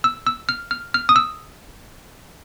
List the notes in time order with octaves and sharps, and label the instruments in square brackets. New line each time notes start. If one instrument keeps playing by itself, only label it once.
[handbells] E6
E6
F6
F6
F6
D#6
E6